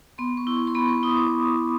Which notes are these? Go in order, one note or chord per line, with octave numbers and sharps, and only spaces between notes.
B3 C6
C#6
E4
C#6
C6
B3 B5
C#6
E4 D#6
D6